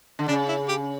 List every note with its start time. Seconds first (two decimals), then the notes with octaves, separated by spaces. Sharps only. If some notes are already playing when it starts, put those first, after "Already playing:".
0.19 D3
0.28 C#3 D4
0.48 E4
0.68 G4